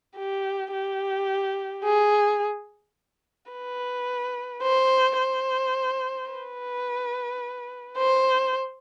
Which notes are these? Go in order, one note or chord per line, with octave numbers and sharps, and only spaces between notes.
G4
G4
G#4
B4
C5
C5
B4
C5